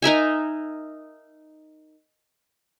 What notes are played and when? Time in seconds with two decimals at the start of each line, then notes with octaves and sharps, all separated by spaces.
0.02 D#4 A#4 E5 G#5